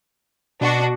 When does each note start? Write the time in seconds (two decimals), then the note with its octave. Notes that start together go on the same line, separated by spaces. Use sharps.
0.61 B2 D4 F#4